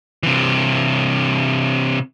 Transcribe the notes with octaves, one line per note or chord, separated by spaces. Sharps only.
C3 E3